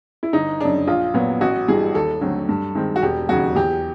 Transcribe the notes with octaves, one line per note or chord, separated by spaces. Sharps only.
E4
G1 D#4
F#2 C#3 D4
A#1 F4
A#2 F#3 B3
A1 F#4
G2 E3 G3 G#4
D#2 A4
D3 F#3 A3 C4
G2
D#3 G#3 C4
F#4
E1 G4
D#2 C#3 F#3 F#4
E2 G4